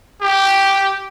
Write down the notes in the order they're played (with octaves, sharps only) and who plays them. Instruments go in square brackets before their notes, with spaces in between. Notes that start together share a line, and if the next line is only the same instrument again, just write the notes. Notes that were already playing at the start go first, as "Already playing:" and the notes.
[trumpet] G4